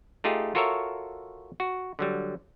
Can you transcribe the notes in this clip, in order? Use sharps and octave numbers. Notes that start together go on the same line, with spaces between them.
A3 D#4 F4 G4 G#4
F4 F#4 A4 A#4 C#5 E5
F#4
D3 F#3 G3